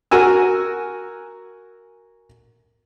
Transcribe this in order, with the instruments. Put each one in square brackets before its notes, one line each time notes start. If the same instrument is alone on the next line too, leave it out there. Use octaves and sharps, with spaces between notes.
[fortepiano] F#4 A#4 G#5 E6